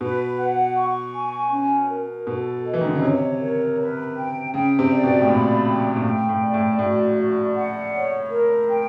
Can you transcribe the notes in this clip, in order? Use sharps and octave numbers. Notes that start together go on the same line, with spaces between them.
B2 B4
F#5
C#6
G#5
C#4
A#4
B2 A4
D#5
E3
D#3
D3
C#3
C3 C#5
A#4
B4
G5
C#3 G5
C3
D5
B2
A2
A#2 B5
G5
A#2
A2 G5
A2
D5
A2
A2 F#4
D5
F#5
C#5
A#4
G5